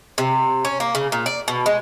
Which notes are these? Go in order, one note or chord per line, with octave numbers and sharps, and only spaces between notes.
C3
C#4
A#3
C#3
A#2
D5
B2
G#3